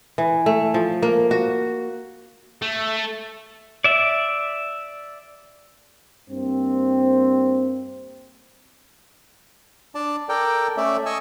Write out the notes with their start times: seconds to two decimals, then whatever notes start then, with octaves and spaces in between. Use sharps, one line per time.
0.18 E3
0.46 A3
0.74 F3
1.03 A#3
1.31 F#4
2.62 A3
3.84 D5 E5
6.30 G2 A#3 C4
9.95 D4 D5 A5
10.29 A4 A#4 D5 G5
10.77 A3 C#4 D5 E5
11.06 D#5 G#5 C#6 E6